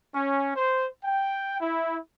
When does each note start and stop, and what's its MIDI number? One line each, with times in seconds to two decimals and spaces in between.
0.14 0.52 61
0.56 0.86 72
1.04 1.58 79
1.61 1.97 64